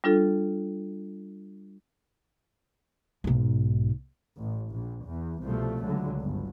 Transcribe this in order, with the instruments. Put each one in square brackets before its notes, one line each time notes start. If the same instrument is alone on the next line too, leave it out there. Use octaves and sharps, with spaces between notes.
[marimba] G3 D4 F4 A4
[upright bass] B1 G#2
[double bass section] A1
A#1
E2
C2 B2 F3 A3
C#2 D3 F#3
G1